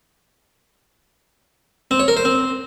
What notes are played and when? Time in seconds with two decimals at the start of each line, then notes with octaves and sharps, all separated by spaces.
1.91 C4
2.00 C#5
2.08 A#4
2.17 C5
2.25 C4